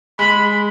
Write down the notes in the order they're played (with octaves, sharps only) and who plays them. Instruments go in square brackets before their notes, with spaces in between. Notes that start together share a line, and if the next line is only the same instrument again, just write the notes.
[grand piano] G#3 [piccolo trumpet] B5